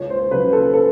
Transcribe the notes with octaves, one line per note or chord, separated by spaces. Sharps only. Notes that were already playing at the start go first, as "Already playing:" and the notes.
Already playing: C#2 C#5
C5
C#3 F#3 B4
A4
A4